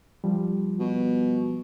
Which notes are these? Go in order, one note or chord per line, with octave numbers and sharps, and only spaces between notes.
F3 G3
B2